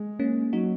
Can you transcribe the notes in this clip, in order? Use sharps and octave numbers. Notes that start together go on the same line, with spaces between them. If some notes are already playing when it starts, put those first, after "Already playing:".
Already playing: G#3
A#3 C#4
F#3 D#4 F#4